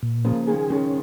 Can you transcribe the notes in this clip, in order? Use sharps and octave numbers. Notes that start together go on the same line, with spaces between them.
A#2
C#3 F3 A#3
D#3 G#3 G#4
D#3 G#3 C#4